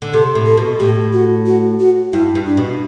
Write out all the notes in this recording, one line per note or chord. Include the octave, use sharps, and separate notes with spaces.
D3
C3 A4
A2
A4
B2
A2 G4
F#4
F#4
F#4
G2 E4
G2
D4
B2